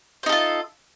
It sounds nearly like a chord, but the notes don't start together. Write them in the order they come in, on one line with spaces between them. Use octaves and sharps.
C5 D#4 A4 F4